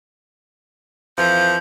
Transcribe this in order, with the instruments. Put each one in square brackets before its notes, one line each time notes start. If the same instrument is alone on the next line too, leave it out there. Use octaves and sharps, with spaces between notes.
[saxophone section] F2 E3 F3 [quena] G6